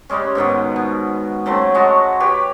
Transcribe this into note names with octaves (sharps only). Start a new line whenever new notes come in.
C#3 G3 G#3 C#4
G#2 B2 D#3 B3
B2
C#3 F#3 A3 C4
F#3 G#3 F#4 A5
G4 B4 C#5